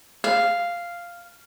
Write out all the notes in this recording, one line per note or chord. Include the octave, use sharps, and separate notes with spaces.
F5